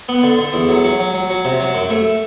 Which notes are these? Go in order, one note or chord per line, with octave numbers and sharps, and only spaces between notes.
B3
D3
D3
E2
F#3
F#3
F#3
F#3
F#3
C3
F#3
F#2
A3